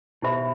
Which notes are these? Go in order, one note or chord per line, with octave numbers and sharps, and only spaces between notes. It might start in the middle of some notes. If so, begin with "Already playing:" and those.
B2 E4 G4 C5 E5 B5